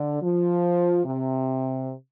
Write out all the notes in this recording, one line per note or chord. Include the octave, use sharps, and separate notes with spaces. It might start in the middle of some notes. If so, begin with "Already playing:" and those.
Already playing: D3
F3
C3